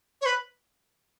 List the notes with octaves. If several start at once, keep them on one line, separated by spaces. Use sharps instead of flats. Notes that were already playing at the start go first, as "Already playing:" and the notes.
C#5
B4